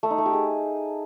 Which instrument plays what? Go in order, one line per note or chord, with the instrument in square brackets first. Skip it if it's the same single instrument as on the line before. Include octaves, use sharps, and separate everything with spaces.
[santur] A3
D#4
A3
G4
G#4